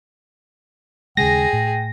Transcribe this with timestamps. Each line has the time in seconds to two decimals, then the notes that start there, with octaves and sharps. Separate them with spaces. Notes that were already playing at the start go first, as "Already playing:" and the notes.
1.17 D#2 C#3 G#3 G#4 G5 A#6
1.53 A2